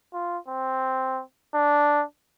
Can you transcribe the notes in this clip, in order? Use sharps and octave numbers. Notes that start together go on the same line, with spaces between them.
F4
C4
D4